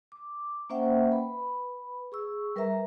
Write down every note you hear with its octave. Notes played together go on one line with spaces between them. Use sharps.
D6
A#3 C#4 C5 E5 F#5 G5
B4 B5
G#4 C#6 E6
G3 A#4 B4 E5 A#5